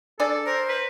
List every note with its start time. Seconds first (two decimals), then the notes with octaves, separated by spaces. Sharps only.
0.20 D4 G#4 A4 D5
0.46 A#4 C5
0.69 B4